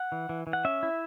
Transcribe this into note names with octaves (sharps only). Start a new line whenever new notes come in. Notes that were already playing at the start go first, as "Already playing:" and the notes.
Already playing: F#5
E3
E3
E3
F#5
C#4 E5
E4